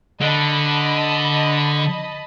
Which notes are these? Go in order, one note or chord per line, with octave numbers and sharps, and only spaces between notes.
D3 D#5 A5 B5